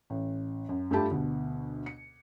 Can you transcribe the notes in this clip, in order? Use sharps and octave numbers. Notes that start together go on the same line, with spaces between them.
A1
F#2
G2 A3 F4 G4 A5 B5
D2 B2
C#7